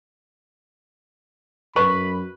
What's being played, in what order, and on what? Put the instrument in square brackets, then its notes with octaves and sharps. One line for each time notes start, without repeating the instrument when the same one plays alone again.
[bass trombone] F#2 [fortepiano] B4 [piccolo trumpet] B5 [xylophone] C#6